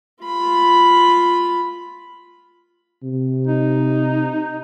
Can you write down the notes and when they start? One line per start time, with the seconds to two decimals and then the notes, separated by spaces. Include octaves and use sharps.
0.23 F4 B5
3.03 C3
3.47 D#4